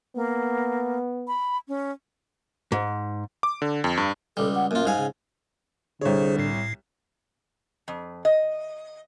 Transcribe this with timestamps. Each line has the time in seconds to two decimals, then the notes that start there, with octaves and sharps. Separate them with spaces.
0.15 A#3 B3
1.28 B5
1.68 C#4
2.72 G#2
3.43 D6
3.62 D3
3.84 F2
3.97 G2
4.37 C#2 G3 A4
4.55 F#5
4.71 F#2 A#3 F4
4.86 G#2 G3 F5 G#5
4.98 C#3
6.01 C2 D3 G#4 C5 C#5
6.38 A2 C7
7.88 F2
8.25 D#5